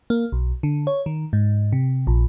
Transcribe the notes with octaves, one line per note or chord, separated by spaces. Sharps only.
A#3
B1
D3
C#5
D#3
G#2
C3
A#1